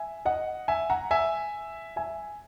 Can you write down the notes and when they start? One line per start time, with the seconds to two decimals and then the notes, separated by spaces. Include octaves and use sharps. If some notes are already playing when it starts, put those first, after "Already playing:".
Already playing: E5 G#5
0.25 D#5 F#5
0.68 E5 G#5
0.90 F#5 A#5
1.11 E5 G#5
1.96 E5 G#5